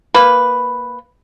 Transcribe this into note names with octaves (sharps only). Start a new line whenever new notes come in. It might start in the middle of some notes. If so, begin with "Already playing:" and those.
A#3 B4